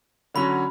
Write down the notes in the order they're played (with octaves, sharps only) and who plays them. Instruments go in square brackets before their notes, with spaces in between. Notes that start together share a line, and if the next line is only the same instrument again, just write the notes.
[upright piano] D3 F#3 C#4 F#4 [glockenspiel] B5